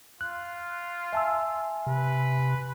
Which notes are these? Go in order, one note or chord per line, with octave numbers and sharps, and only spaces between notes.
F4 F#6
E5 G#5 A5 C6 E6
C3 B4